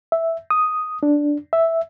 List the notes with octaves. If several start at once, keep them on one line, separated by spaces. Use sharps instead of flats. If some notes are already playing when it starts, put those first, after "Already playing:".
E5
D#6
D4
E5